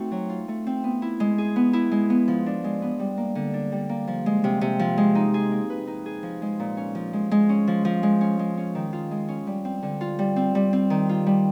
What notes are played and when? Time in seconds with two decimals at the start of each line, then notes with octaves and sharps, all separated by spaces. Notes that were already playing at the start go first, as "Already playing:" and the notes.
Already playing: A3 C4 D#4 F#4
0.11 F#3
0.30 F4
0.48 A3
0.67 C4
0.84 B3
1.02 E4
1.20 G#3
1.38 G#4
1.56 B3
1.73 E4
1.92 G#3
2.10 B3
2.28 F3
2.46 D4
2.64 G#3
2.82 B3
3.00 G3
3.17 A#3
3.35 D3
3.54 D4
3.72 G3
3.89 A#3
4.08 F3
4.26 G#3
4.44 C3
4.61 C3
4.79 F3
4.98 G#3
5.15 D#4
5.34 G#4
5.51 A#3
5.70 B4
5.87 D#4
6.06 G#4
6.23 F3
6.42 G#3
6.60 A#2
6.77 C#4
6.95 F3
7.13 G#3
7.31 G#3
7.49 C#4
7.68 F3
7.85 F3
8.03 G#3
8.21 C#4
8.39 G#3
8.57 C#4
8.75 D#3
8.93 F4
9.11 G#3
9.28 C#4
9.47 G3
9.65 C4
9.83 D3
10.01 F4
10.19 G3
10.36 C4
10.55 G3
10.73 C4
10.90 D#3
11.09 F4
11.26 G3